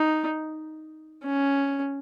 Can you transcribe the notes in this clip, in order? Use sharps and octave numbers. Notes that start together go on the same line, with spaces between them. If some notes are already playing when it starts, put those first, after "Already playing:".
Already playing: D#4
C#4